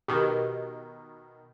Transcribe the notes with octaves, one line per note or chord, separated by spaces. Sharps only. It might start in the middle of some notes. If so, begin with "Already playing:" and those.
B2 D#3 G4